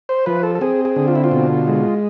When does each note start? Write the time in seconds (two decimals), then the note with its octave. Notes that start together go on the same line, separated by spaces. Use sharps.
0.09 C5
0.26 F3 B4
0.43 A4
0.55 A4
0.61 C4 G#4
0.85 G#4
0.96 D3
1.08 F4
1.15 E4
1.24 F4
1.31 B2
1.67 G#3